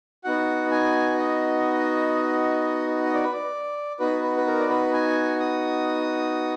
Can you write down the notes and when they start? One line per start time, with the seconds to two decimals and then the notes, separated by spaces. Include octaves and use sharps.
0.24 B3 D#4 F#4 F#5
0.71 G#5
1.18 D#5
3.06 D#5
3.14 D5
3.24 B4
3.32 D5
3.99 B3 D#4 F#4 B4
4.23 B4
4.37 B4
4.46 A#4
4.60 D5
4.70 B4
4.93 G#5
5.40 D#6